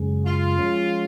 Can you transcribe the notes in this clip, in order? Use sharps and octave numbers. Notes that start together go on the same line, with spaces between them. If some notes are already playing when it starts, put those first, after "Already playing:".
Already playing: F#2 C#3 G#3
F4
F3 G#3 C#4